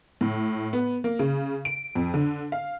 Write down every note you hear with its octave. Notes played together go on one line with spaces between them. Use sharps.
A2
B3
A#3
C#3
D7
F2
D3
F5